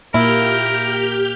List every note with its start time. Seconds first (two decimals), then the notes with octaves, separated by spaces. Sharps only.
0.14 A#2 A#3 E4 G4 A#4 F6 G6